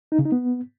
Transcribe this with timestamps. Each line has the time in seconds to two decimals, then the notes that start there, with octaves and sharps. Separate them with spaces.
0.12 D#4
0.19 C#3
0.25 D#4
0.32 B3